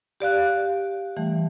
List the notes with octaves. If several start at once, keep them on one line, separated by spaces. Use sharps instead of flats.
G4 D5 F5 F#6
E3 G3 A3